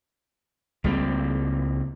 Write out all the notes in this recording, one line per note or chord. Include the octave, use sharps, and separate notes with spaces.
C#2 G3 A#3 C4